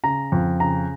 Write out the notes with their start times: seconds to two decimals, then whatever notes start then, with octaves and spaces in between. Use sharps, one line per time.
0.04 C#3 A#5
0.32 F2
0.60 C#3 A#5